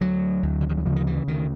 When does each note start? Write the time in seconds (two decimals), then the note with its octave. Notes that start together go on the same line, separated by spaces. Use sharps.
0.01 D2 F#3
0.43 D2
0.61 D3
0.69 D#3
0.78 E3
0.86 C#3 F3
0.96 D#3
1.07 E3
1.28 D2 D#3